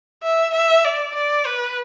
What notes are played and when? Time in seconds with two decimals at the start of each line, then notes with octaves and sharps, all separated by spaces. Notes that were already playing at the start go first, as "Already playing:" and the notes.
0.23 E5
0.55 E5
0.85 D5
1.15 D5
1.46 B4